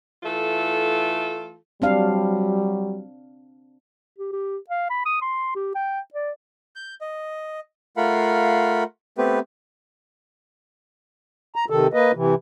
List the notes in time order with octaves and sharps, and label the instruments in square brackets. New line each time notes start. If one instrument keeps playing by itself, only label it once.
[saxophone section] E3 A3 F4 A4
[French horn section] F#3 G3 [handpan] C4 D4 F5
[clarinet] G4
G4
F5
B5
D#6
C6
G4
G5
D5
[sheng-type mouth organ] G6
D#5
A3 F4 A#4 F5 F#5 B5
A3 B3 C4 G4 B4
[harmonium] A#5
C3 D#3 A4
A#3 B4 D#5
C3 E3